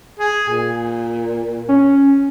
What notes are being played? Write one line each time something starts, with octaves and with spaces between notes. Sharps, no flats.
G#4
A#2
C#4